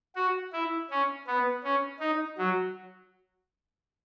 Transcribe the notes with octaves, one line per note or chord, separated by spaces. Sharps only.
F#4
E4
C#4
B3
C#4
D#4
F#3